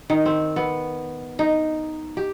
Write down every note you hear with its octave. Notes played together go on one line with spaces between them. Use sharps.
D#3
C4
B3
D#4
G4